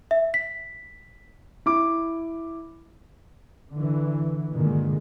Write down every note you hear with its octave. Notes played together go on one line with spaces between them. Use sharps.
E5
B6
E4 D6
D3 E3
G2 A#2 D3 D#3 G#3